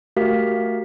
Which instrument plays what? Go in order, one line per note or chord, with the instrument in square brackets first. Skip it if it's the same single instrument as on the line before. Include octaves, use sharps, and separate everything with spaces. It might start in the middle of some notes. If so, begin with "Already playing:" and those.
[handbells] A3 F#4 G4 A#4 F5 B6